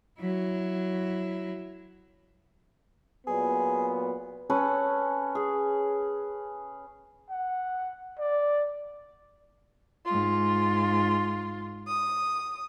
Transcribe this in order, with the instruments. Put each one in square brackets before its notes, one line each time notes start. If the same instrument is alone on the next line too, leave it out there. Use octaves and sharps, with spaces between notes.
[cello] F#3 E4
[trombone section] A#2 F#3 B3 [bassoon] G#4
[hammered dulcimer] C#4 A4 B4
G#4
[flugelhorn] F#5
D5
[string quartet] G#2 F4
D#6